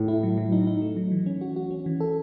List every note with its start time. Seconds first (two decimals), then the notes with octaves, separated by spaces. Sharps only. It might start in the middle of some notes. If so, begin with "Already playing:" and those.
Already playing: A2
0.08 E4
0.23 F#3
0.38 F#3
0.52 D#4
0.67 D#4
0.82 A3
0.97 F#3
1.12 E3
1.26 C#4
1.41 F#4
1.56 F#4
1.71 C#4
1.86 E3
2.00 A4